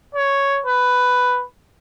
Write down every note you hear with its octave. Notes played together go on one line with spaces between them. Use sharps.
C#5
B4